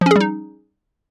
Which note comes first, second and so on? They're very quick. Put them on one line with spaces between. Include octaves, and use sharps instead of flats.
F3 C#4 G#4 G3 D#4